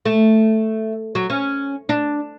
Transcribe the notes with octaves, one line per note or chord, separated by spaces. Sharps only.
A3
F#3
C#4
D4